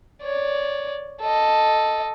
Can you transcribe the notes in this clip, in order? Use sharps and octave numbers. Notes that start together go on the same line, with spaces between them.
C#5 D5
A4 D#5